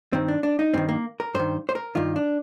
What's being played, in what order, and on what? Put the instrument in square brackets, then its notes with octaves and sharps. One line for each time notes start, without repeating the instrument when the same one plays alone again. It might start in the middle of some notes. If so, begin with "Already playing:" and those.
[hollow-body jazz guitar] G2 D#3 C4
D4
D4
D#4
G2 D#3 C4
A#3
A#4
G2 D#3 C5
C5
A#4
G2 D#3 F4
D4